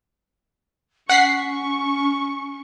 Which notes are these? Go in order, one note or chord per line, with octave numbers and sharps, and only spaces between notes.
C#4 F#5 C#6 B6 C7